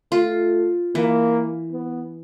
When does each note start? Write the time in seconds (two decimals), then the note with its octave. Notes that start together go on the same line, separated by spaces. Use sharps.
0.12 A3 F4
0.95 E3 A#3
1.72 B3